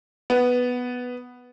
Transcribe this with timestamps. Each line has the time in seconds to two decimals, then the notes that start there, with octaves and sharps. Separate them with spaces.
0.30 B3